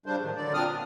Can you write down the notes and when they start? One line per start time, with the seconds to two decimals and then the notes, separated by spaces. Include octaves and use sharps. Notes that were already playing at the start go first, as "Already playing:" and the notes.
0.06 C#3 G3 D4 C5
0.22 A2 D#3 F3
0.36 D3 F#3 D5
0.54 A#2 F3 C4 D4 D#6 F6
0.68 A#2